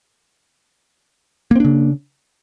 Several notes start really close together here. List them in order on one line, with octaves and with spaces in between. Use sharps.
A#3 C4 D4 C#3